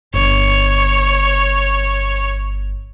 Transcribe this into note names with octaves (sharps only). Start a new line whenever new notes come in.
G1 C#5